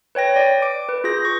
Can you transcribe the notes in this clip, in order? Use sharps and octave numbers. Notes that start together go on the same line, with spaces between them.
B4 C#5 G5 A#6
D5
D6 D7
B4
F4 G#4 G6 A#6
C#6